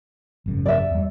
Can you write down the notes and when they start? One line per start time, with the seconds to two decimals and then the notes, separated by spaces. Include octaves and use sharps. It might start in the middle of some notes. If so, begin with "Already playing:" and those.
0.46 G#1 F#2 C#3
0.66 D5 E5
0.91 E2 G3